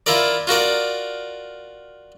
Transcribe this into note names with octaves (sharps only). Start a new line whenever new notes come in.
E4 F4 A#4 D5
F4 F#4 A#4 D5